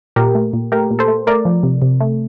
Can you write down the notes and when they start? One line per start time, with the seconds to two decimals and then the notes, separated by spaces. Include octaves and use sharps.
0.16 A#2 G4 A#4
0.35 A3
0.53 A#2
0.72 A3 G4 A#4
0.91 A#2
0.99 A4 C5
1.08 A3
1.27 A3 A#4 D5
1.45 F3
1.63 C3
1.82 C3
2.01 A3